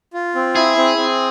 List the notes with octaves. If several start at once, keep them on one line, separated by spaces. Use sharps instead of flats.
F4
C4
E4 G#4
C4
C4